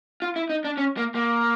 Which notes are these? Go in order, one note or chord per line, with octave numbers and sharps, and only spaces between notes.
F4
E4
D#4
D4
C#4
A#3
A#3